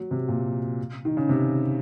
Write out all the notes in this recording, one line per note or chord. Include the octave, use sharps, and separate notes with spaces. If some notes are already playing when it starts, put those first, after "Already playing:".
Already playing: F#3
C3
A#2
D#3
C#3
C3